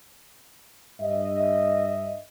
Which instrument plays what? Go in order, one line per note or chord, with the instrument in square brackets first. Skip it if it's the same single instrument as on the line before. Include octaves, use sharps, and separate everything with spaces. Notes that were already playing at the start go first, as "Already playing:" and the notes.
[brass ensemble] G2 D#5 E5